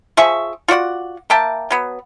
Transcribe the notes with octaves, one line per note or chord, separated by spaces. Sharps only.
F3 G#4 E5 C#6
F4 F#4 D5 F#5
A#3 E5 G5 A5
F#3 B3